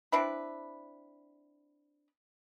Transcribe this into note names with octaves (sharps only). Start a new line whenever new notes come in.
C4 D4 E4 B4